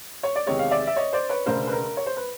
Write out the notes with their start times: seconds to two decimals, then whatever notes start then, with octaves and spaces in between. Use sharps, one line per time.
0.23 C#5
0.36 D5
0.46 E2 C3 D#3 G#3 C#5 D#5
0.59 F5
0.71 D5 E5
0.87 E5
0.96 C#5 D#5
1.13 C5 D5
1.29 B4 C#5
1.46 E1 D2 C#3 A#4 C5
1.67 B4
1.72 A#4
1.97 C#5
2.06 C5
2.17 B4